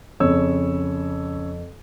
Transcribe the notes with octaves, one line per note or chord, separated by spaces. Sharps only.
F2 C#3 C#5 E6